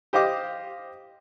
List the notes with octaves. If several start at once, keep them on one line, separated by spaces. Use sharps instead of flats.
G4 C5 D#5 F5 D6